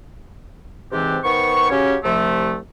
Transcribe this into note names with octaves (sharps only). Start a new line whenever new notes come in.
G#2 C3 E3 C4 D4 G4
D#3 B3 C5 C#6
C#3 F#3 C#4 G4 C#5
C2 C3 F3 A3